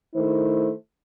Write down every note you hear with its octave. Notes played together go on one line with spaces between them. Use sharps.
D#3 A3 E4 C5